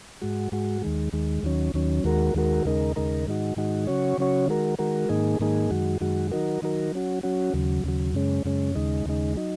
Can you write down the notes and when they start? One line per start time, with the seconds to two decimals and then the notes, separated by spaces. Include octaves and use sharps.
0.21 G#2 G#3 F#4
0.52 G#2 G#3 F#4
0.82 D#2 D#3 G#3
1.13 D#2 D#3 G#3
1.43 D#2 D#3 F#3 C#4
1.74 D#2 D#3 F#3 C#4
2.04 D#2 D#3 G#3 F#4 A#4
2.34 D#2 D#3 G#3 F#4 A#4
2.65 D#2 C#3 G#3 D#4 A#4
2.96 D#2 C#3 G#3 D#4 A#4
3.26 G#2 D#3 G#3 D#4 F#4
3.56 G#2 D#3 G#3 D#4 F#4
3.87 C#3 F#3 C#4 F#4 C#5
4.18 C#3 F#3 C#4 F#4 C#5
4.48 D#3 G#3 F#4 A#4
4.79 D#3 G#3 F#4 A#4
5.09 G#2 D#3 A#3 D#4 G#4
5.40 G#2 D#3 A#3 D#4 G#4
5.71 F#2 D#3 G#3 F#4
6.01 F#2 D#3 G#3 F#4
6.31 D#3 F#3 D#4 F#4 A#4
6.62 D#3 F#3 D#4 F#4 A#4
6.92 F#3 C#4 F#4
7.23 F#3 C#4 F#4
7.54 D#2 C#3 F#3
7.84 D#2 C#3 F#3
8.14 F#2 C#3 G#3 C#4
8.45 F#2 C#3 G#3 C#4
8.75 D#2 C#3 G#3 D#4
9.06 D#2 C#3 G#3 D#4
9.36 F#3 D#4